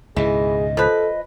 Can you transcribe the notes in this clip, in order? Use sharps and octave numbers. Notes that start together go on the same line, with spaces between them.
C#2 G#2 B2 E3 G#4 D#5
F3 A4 B4